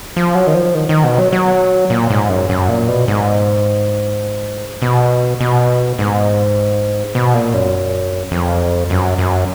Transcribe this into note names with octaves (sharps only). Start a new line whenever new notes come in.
F3
F#3
D#3
F3
D#3
D#3
B2
F#3
F#3
A#2
G#2
F#2
F#2
A#2
B2
G#2
B2
B2
G#2
B2
A#2
F#2
F2
F#2
F#2